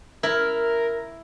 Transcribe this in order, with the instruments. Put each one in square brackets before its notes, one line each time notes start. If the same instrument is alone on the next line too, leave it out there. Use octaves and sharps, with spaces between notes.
[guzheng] E4 [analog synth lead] A#4